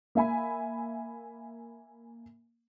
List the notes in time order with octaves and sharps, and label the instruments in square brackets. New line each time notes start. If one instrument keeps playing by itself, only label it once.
[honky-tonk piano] A#3 E5 G#5 B5